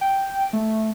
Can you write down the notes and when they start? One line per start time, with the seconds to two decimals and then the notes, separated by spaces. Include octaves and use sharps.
0.01 G5
0.53 A3